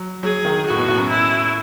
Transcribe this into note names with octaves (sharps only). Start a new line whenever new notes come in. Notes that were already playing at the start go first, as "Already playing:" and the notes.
Already playing: F#3
F#3 G#4
D#3
A2 F#4
B2
A2
F#2
E4